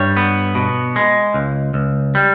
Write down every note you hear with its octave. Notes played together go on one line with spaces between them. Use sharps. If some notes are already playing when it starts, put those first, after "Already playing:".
Already playing: G2 G3 C#5
B3
B2
G#3
C#2
C#2
G3